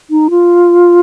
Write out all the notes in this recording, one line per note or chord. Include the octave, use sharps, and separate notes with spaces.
D#4
F4